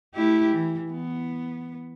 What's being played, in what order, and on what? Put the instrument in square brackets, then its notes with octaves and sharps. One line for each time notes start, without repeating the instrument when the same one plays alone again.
[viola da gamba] A3 E4 G4
E3
B3